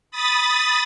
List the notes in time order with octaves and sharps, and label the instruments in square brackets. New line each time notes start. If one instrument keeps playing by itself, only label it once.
[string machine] B5 D#6 A6